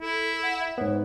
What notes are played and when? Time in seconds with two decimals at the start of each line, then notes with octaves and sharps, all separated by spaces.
0.01 E4 A4
0.43 F#5
0.60 E5
0.78 G#2 B3 C#5